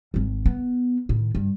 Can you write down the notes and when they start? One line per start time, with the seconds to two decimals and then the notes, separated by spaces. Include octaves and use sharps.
0.14 G#1 G#2
0.46 B3
1.09 A2 D#3
1.35 G2